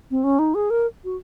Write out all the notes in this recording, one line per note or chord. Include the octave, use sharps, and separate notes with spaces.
C4
C#4
D#4
G#4
A#4
F#4